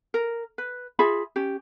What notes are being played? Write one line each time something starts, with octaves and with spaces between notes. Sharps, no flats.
A#4
B4
F4 G#4 E5 B5
C#4 G4